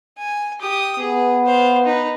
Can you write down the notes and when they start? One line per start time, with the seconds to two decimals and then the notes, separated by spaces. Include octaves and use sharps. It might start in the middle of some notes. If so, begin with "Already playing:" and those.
0.18 G#5
0.60 G4 D#6
0.99 B3 G#4
1.45 C5 F5
1.85 D#4 B4